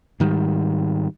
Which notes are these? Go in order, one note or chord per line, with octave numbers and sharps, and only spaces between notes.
G#2 D#3 G3